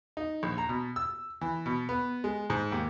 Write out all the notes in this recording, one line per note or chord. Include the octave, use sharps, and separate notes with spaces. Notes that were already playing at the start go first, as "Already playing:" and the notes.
D#4
A#1
A#5
B2
E6
E3
B2
B3
G#3
G#2
D#2